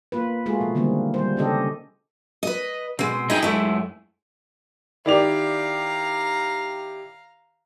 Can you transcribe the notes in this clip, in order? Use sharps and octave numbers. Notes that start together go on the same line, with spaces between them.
A#3 F4 B4
G#3 A3 F4 F#4 G#4
B2 F3
D3 D#3 G3 A#3 C4
G3 C5
C#3 C#4 D4 G4 A4 D#5
B4 D#5
B2 G#3 C4
D#4 E4 G#4 D#5 G5
F#2 G#3 A3 E4
D#3 E4 G4 D5 F5 A#5 F7